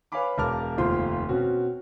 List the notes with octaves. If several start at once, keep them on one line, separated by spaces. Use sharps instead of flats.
B4 C#5 F5 G#5 B5 D6
E1 A#4 A5 D6 F6
F1 D#2 F4 C5 C6
B2 C4 C#4 F#4